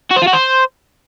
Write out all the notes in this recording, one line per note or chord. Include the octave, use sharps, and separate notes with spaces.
F#4
C5
F4
F#4
C5